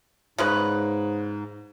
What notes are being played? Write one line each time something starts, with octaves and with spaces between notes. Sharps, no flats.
G#2 C#3 G#3 B4